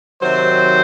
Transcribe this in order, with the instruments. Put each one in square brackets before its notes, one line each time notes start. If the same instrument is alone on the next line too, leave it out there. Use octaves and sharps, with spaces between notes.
[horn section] C3 D#3 F#3 C5